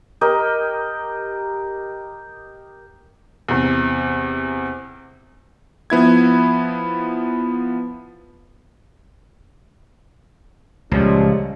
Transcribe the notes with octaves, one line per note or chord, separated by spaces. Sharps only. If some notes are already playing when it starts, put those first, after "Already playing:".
G4 A#4 D#5
E2 C3
F3 B3 E4 G#6
C#2 A#2 F3 G3 G#3 C#4